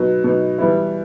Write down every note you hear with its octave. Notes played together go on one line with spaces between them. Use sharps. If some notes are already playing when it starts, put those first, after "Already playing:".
Already playing: B2 F#3 B3 D#4
B2 F#3 B3 D#4
E3 G3 B3 E4